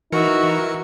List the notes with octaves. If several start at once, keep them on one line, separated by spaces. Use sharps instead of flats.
E3 D#4 F#4 A#4 E5 C#7